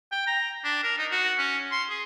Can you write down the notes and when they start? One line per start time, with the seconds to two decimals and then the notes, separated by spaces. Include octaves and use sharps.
0.12 G5
0.27 A#5
0.64 D4
0.83 A#4
0.98 D#4
1.11 F#4
1.38 C#4
1.72 C6
1.90 G#4